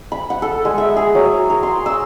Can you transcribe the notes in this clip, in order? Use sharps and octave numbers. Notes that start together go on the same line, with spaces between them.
B5
F#5
A4
G#3
E5
G#4
F#3
A#4
C6
E6